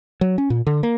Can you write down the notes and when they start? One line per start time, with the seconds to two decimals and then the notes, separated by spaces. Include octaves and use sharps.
0.21 F#3
0.38 C#4
0.50 A#2
0.67 D3
0.83 A#3